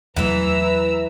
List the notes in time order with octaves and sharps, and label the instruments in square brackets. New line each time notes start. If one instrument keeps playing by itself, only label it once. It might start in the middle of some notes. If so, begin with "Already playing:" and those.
[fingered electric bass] E2 F#3 A3 [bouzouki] E3 E4 [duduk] B4 [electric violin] A#5 E6